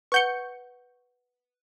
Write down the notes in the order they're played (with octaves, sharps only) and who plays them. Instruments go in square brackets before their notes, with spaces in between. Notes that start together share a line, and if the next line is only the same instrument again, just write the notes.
[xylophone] B4 F#5 G7 [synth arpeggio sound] C#6 G6 C#7